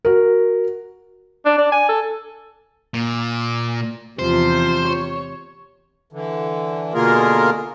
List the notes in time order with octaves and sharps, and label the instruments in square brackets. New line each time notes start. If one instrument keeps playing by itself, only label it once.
[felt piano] F#4 A#4
[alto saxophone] D4
D4
G#5
A4
[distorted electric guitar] A#2
[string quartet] E2 C3 F3 [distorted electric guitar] C5
[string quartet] C#5
[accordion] D3 E3
B2 D3 A#3 F4 G#4 A#4